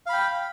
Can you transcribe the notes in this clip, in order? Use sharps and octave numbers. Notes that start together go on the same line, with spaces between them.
F5 G5 B5